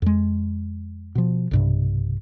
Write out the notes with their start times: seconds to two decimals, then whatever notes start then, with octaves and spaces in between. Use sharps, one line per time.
0.02 F2 G#3
1.15 B2 F3
1.51 B1 G2 C3